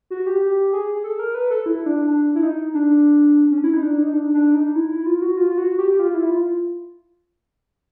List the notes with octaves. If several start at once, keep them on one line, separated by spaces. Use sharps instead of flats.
F#4
G4
G4
G#4
A4
A#4
B4
A4
E4
D4
D4
E4
D#4
D4
C#4
E4
D#4
D4
D#4
D4
D4
D#4
E4
E4
F4
F#4
F4
F4
F#4
G4
F4
E4
F4